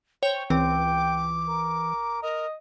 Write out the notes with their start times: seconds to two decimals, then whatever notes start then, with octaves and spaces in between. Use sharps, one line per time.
0.23 C5 C#5 G5
0.50 C#2 E3 C4 G5 D6
1.48 A#4
2.23 A#4 D#5